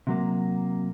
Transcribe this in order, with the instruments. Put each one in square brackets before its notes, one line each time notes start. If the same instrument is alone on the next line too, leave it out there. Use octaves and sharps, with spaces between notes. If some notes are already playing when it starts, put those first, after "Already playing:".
[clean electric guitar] C3 F#3 A#3